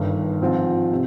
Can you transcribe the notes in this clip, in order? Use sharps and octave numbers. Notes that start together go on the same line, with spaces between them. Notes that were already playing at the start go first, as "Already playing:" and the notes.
Already playing: G1 G2 D#3
G#2 F3 C4 F4
C3